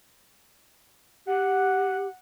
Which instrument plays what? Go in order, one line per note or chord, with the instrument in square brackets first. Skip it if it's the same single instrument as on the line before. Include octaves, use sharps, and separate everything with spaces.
[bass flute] G4 [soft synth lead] F#5